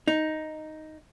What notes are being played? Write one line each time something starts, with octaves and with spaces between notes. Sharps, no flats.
D#4